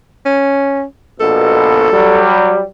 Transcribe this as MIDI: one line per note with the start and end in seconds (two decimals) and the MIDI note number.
0.26 0.84 61
1.20 1.88 34
1.20 1.88 47
1.20 2.22 69
1.93 2.65 54
1.93 2.65 55